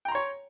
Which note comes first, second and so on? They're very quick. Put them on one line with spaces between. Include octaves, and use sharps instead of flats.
G5 A#5 C6 C#5